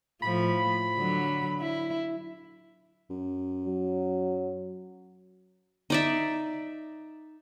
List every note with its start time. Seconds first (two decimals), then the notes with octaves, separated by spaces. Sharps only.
0.23 A2 F3 B5
0.97 D3 F#3
1.61 E4
3.10 F#2
3.66 F#3
5.90 D#4 D5 E5